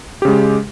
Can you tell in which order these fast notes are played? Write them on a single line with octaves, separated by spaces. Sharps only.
G4 C#3 G#3